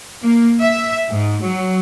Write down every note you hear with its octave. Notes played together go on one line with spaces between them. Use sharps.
A#3
E5
G#2
F#3